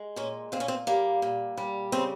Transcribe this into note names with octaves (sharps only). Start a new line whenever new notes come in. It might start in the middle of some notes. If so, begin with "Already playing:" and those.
Already playing: G#3
A#2 C#4
A#2 C4
C#4
C4
G3 A#3
A#2
G3
C#3 C4